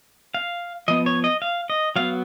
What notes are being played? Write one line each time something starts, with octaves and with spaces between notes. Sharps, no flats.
F5
F3 B3 D#5
C#5
D#5
F5
D#5
F#3 B3 F5